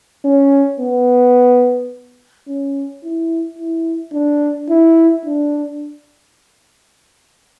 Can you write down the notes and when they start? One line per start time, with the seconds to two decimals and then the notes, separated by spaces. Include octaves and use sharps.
0.25 C#4
0.80 B3
2.48 C#4
3.04 E4
3.58 E4
4.14 D4
4.69 E4
5.26 D4